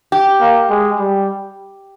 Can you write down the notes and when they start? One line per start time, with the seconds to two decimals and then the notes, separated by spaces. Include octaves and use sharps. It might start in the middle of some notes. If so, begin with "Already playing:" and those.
0.12 G4
0.41 A#3
0.70 G#3
0.99 G3